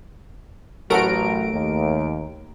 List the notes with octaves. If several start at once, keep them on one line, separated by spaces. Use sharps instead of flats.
A1 F#3 A3 F#4 A4 A#4 F#5 D7
D#2